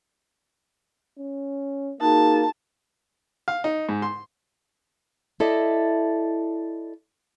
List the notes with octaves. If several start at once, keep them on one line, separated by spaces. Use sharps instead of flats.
C#4
A#3 D#4 F#4 G#4 A5
F5
D#4
G#2
C6
E4 A4 D5 D#5